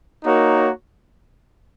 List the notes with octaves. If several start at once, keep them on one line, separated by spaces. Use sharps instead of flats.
A#3 D#4 F#4 A#4 C#5